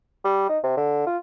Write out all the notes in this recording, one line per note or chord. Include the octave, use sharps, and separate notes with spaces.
G3
D#4
C3
D3
F4